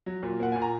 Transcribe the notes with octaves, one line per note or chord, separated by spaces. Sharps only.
F#3
A#2
A#3 F#5
A#2 G#5
A#5